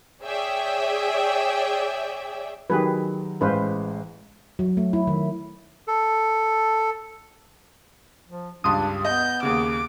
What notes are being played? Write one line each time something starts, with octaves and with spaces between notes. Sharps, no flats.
G#4 C#5 D5 E5 G5
D#3 F#3 G4 G#4 B4
A1 G#3 B4 C5 F5
F#3
A3
E4
D#3
A4
F3
C#2 G2 D4 C6 D#6
B3 D#5 G6
D#2 C#3 D6